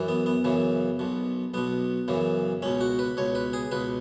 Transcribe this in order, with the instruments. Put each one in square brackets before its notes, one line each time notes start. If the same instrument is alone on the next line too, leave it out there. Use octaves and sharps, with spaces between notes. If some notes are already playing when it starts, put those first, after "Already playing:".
Already playing: [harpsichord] F#2 E3
B3
B3
F#2 C#3 E3
B1 B2
B1 B2 B3
F#2 C#3 E3
C#2 B2 C#4
F#4
B4
C#2 B2 C#5
B4
G#4
C#2 B2 B4